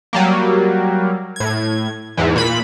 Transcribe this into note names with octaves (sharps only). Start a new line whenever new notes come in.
F#3 G3 A#3
A2 G#6
E2 G#2 E3
A#2 B5